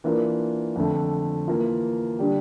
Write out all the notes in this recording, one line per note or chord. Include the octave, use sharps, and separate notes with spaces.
E3 A#3 D4 F4 A#4
F2 D3 A3
E3 A#3 F4
D3 G3 D4 G4